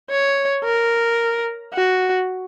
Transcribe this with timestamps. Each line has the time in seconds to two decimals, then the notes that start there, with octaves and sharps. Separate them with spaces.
0.10 C#5
0.64 A#4
1.74 F#4